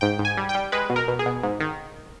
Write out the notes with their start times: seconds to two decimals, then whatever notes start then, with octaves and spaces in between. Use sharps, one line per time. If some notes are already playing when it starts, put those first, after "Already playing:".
0.01 G#2 G5
0.19 G#2
0.25 G#5
0.38 G3
0.49 G5
0.55 G3
0.72 G#3 B4
0.90 B2
0.96 A#4
1.08 B2
1.19 G#4
1.26 B2
1.43 G#2
1.60 D#3